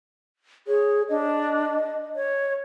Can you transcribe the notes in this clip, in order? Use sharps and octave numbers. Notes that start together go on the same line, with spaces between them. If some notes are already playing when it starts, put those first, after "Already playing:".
G#4 C#5
D4 D#5
C#5